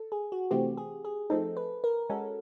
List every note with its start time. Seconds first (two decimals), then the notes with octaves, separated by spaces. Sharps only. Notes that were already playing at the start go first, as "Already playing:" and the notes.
Already playing: A4
0.12 G#4
0.32 F#4
0.51 C3 E3 A3 C4 G4
0.77 G#4
1.05 G#4
1.30 F3 A3 C4 D#4 A4
1.57 B4
1.84 A#4
2.10 G#3 C#4 F#4 A4